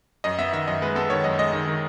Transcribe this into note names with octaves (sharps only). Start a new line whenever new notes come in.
F#2 D#5
B3 E5
D#3 E5
F#2 D#5
G#3 B4
B3 A4
D#3 C#5
F#2 D#5
G#3 D#5
D#3
D#3